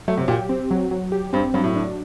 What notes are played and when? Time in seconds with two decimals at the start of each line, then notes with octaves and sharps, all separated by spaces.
0.08 F#3 A3
0.17 C3
0.28 A#2 G4
0.49 C4
0.71 F#3
0.91 F#3
1.12 G4
1.33 G2 C4
1.54 G2 F#3
1.64 A2
1.75 D4